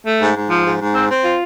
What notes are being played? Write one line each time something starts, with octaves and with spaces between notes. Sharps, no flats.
A3
G#2
G#2
F3
G#2
G#2
C4
C4
F4